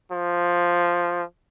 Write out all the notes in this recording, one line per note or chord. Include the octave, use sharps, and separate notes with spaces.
F3